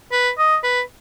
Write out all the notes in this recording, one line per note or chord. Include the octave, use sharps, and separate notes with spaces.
B4
D#5
B4